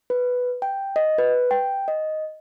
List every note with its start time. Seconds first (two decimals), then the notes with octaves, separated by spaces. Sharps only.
0.10 B4
0.62 G5
0.96 D#5
1.18 B4
1.51 G5
1.88 D#5